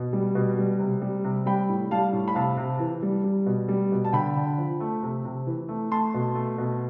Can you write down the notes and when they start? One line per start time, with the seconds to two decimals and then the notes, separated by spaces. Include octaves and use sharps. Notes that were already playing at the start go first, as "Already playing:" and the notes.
Already playing: B2
0.13 G3
0.35 B2
0.58 G3
0.79 C3
1.02 G3
1.24 C3
1.46 G3 G5 B5
1.69 A2
1.91 G3 F5 A5
2.13 A2
2.28 B5
2.35 C3 F5 A5
2.57 C3
2.79 E3
3.02 G3
3.24 G3
3.46 B2
3.68 G3
3.92 B2
4.05 A5
4.13 D3 G5 B5
4.36 D3
4.58 F3
4.80 A3
5.03 C3
5.25 C3
5.47 E3
5.69 A3
5.91 A3 A5 C6
6.14 B2
6.35 A3
6.58 B2